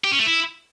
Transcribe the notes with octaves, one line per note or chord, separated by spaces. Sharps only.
G4
C#4
A3
E4